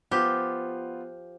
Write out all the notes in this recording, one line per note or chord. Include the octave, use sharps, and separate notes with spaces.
F3 B3 F4 G4